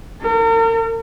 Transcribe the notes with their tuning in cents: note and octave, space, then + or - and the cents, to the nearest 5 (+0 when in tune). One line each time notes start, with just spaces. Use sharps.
A#4 -40